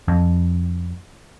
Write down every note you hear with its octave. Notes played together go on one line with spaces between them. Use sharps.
F2